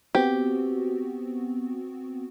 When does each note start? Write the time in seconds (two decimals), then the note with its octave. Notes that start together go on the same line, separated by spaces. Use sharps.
0.15 B3 C4 F#4 G4